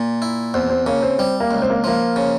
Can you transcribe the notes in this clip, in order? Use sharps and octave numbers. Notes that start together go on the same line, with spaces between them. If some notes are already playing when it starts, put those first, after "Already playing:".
Already playing: A#2
E4
E2 C4
C4
C#3 A#3
C4
G3 C4
A#3
C#2
C4
A#3
F3 A#3
C#3